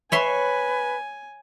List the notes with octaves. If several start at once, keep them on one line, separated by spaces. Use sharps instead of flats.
B4 C#5 E5 G#5 C6